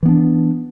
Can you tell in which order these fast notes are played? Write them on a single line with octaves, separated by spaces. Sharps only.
E3 B3 D4